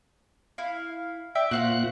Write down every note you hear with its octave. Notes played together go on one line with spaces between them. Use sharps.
E4 F5
D5 E5 G5
A#2 F#4 C5 F5 F#6